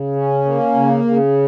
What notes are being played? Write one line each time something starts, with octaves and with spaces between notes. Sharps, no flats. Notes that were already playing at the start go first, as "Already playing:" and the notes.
Already playing: C#3
C#4
A#3
C#3
C#3